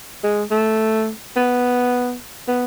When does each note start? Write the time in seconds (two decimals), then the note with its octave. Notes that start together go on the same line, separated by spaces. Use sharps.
0.24 G#3
0.51 A3
1.36 B3
2.48 B3